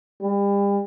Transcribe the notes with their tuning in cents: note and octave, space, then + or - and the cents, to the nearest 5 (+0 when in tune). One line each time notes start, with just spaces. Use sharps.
G3 +40